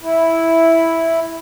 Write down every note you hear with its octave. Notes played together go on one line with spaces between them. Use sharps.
E4